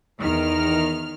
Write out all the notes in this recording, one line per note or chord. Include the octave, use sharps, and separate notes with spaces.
E2 D#3 F6